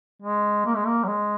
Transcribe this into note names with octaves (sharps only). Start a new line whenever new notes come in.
G#3
A#3
G#3
A#3
F#3
G#3